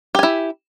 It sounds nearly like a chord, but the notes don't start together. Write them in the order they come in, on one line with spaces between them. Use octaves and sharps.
G4 G#5 E4